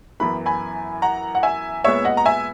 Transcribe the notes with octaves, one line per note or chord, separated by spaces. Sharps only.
F#2 E3 B3 B5
G#5 B5
F#5 A#5
F#5
E5 G#5
A#2 G#3 B3 C#5 E5
D#5 F#5
A#5
E5 G#5